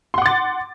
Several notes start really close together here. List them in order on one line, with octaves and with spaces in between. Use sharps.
C6 F#5 D6 A6